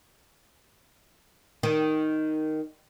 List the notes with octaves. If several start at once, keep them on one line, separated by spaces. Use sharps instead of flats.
D#3